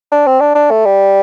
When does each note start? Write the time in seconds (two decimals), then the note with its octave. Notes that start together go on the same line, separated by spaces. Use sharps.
0.12 D4
0.27 C4
0.41 D4
0.55 D4
0.71 A3
0.86 G3